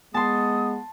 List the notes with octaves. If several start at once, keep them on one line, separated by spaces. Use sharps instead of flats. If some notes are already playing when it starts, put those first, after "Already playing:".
G#3 B3 A5 C6 D#6